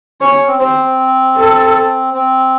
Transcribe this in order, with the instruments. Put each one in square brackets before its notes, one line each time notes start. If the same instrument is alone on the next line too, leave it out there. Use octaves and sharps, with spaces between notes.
[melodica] C#4 [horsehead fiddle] C#5
[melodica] C#4
C4
[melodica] C4 [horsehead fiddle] C5
[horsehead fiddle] A4
[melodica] C4